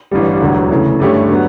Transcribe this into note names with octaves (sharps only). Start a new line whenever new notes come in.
A1 G2 D3 G3
E1 D2 D3 F#3
C#3 E3 A3
G2 D3 A3 C#4 G4
D3 F#3 B3